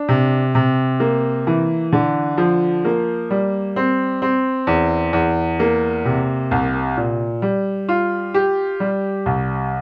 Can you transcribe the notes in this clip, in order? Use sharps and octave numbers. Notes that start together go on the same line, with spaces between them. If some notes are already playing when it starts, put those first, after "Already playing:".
Already playing: D4
C3
C3
A#3
E3
D3
F3
A#3
G3
C4
C4
E2
E2
A#3
C3
C2
A#2
G3
F4
G4
G3
C2